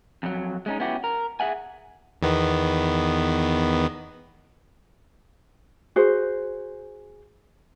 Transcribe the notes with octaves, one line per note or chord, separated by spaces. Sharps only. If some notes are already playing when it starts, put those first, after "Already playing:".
F2 F#3
G#3 C#4 D#4
B3 C#4 E4 F#4 G4
A#4
G#4 E5 F#5 G#5
E2 D#3 B3
F#4 G#4 C5